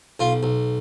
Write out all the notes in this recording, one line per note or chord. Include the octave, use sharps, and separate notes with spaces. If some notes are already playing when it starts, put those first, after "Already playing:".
B1 F4
B1